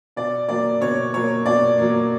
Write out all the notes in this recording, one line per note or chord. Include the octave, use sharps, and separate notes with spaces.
B2 D5
F#3 A#3 D5
B2 C#5
F#3 A#3 C#5
B2 D5
F#3 A#3